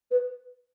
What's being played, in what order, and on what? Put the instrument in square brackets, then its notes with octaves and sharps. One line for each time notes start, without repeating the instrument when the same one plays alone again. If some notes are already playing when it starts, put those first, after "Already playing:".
[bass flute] B4